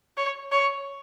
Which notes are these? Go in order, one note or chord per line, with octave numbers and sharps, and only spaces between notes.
C#5
C#5